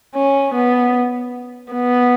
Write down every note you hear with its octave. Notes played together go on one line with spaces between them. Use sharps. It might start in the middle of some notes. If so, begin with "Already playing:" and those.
C#4
B3
B3